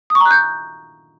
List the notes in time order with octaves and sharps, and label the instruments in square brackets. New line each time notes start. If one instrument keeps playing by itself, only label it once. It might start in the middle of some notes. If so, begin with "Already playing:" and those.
[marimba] D#6
C#6
A#5
F#6
G6